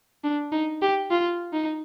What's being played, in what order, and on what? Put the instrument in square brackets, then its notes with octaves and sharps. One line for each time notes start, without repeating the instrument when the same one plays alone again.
[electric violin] D4
D#4
G4
F4
D#4